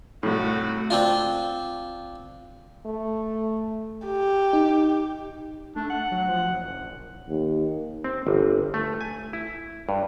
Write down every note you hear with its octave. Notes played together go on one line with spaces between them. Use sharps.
C2 A2 A3 F#4
C4 D4 F4
A3
G4
D#4
A3 D4
F#5
F#3
F3
F#1
A#1
D#2
C4
G1
A3
G#5
E4
G2